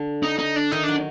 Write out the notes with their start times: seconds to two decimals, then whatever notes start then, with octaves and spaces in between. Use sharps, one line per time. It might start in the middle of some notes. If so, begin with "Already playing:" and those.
Already playing: D3
0.23 D#4
0.39 D#4
0.56 D4
0.72 D#3 D#4
0.84 F#3 D4